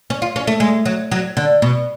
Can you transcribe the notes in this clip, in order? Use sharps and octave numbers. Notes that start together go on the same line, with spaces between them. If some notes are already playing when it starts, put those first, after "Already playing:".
C#4
F4
C#4
A3
G#3
F#3
F#3
D3
B2